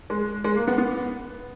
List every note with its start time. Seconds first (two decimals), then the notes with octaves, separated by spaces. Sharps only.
0.10 G#3
0.44 G#3
0.56 A#3
0.67 B3
0.78 B3